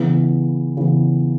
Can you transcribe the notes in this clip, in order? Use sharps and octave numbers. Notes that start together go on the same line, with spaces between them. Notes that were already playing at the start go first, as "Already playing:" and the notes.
Already playing: C#3 E3 B3
C#3 E3 B3